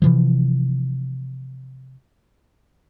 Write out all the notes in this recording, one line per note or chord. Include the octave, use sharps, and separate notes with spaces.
C3 E3 F3